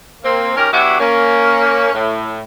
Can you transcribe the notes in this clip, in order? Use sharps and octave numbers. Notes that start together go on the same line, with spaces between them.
A#3 C4
D#3 C#4 G4 A#4
F#3 B3 D4 E4 F#4 G4
A#3 C#4
A2